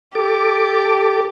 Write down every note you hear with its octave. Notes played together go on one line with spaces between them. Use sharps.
G4 A4 D6